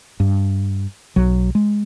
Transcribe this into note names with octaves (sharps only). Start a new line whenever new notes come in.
G2
B1 F#3
G#3